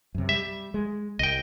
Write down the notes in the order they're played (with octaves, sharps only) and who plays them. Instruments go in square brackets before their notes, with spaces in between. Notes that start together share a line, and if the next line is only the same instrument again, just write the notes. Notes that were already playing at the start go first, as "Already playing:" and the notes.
[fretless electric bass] F#2 C3
[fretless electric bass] G3 [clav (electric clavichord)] E5
[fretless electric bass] G#3
[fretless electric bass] C2 [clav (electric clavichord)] D#5 G5